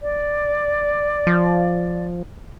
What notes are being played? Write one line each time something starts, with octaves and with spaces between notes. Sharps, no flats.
D5
F3